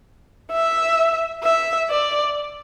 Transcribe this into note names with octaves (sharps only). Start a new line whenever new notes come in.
E5
E5
D5